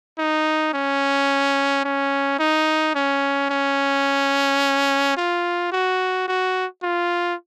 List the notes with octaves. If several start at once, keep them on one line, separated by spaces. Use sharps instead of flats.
D#4
C#4
C#4
D#4
C#4
C#4
F4
F#4
F#4
F4